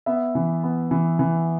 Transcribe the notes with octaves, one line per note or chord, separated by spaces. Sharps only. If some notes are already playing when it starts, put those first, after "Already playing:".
B3 E5
E3
B3
E3
E3